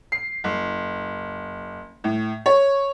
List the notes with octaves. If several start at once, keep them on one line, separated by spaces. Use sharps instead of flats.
C7
F#1
A2
C#5